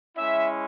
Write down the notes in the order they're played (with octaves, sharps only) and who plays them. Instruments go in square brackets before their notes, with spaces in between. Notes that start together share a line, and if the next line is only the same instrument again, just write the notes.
[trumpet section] G#3 C#4 E4 E5